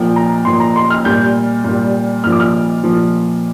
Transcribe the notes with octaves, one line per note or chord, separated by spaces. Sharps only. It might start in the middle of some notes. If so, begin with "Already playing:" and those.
Already playing: A#2 F3 G5
A#5
A#2 F3 C6
A#5
C6
F6
A#2 G3 G6
A#2 G3
A#2 F3 F6
D6
F6
A#2 F3